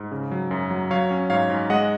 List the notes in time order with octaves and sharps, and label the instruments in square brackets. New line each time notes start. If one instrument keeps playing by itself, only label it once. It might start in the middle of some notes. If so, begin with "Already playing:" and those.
Already playing: [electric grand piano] G#2
C#3
F#3
F#2
F#3
F#3 C#5 F5
C#4
G#2 C#5 F5
G#2
G#3 D#5 F#5